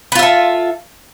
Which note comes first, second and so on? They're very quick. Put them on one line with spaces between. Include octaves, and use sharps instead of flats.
B4 F4 E5 A4